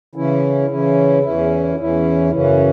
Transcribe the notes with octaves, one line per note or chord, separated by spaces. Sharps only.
C#3 E3 C#4 E4
C#3 E3 C#4 E4
E2 E3 C#4 E4
E2 E3 C#4 E4
F#2 C#3 E3 C#4